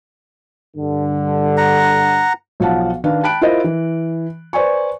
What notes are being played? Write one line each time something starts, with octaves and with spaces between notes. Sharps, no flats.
G2 D3
F#5 A#5
B1 F3 F5 F#5 A5
D#3 D4 B4 F5
G5 A5 B5 F#6 D7
E4 F4 A#4 C5 D#5
E3
B4 C5 D5 G#5 C#6